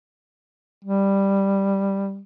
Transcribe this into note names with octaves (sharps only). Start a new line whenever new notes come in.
G3